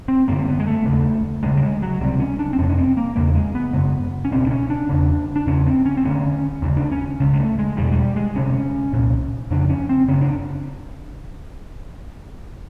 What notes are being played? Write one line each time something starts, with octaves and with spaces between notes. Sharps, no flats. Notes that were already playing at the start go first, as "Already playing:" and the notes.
C4
F#2 D3 A#3
C4
B3
G#3
A3
D#2 C#3
D2 C#3 G#3
G3
G#3
F#3
C#2 C3 G3
C#4
D4
C4
F2 C3 C#4
C#4
C4
A#3
E2 C#3 A#3
G#3
B3
F#2 C#3
C#4
C#2 B2 C4
D4
C#4
D4
E2 C#3
D4
E2 C#3 C#4
C4
C#4
C4
D2 D3 C#4
D#2 C#3
D4
C#4
C#2 C#3
G#3
A3
G#3
E2 B2 G3
G#3
G3
G#3
D2 C3 C#4
C2 A#2
F2 C#3 D4
C#4
C4
F#2 C#3 C#4
D4